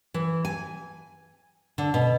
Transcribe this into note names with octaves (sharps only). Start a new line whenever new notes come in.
E3
G#5
D3
B2